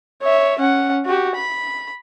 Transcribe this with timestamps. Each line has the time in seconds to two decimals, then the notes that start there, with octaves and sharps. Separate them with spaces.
0.22 C#5 E5
0.59 C#4 F#5
1.05 F#4 G4
1.35 B5